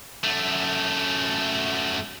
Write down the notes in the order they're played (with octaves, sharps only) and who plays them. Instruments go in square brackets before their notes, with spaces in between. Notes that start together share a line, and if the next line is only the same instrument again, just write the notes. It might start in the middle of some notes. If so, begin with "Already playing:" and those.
[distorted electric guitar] F#2 A3